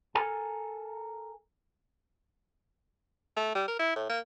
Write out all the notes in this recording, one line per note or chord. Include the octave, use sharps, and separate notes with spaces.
A4 A#4 G#5 A5
A3
G3
A#4
E4
A2
A#3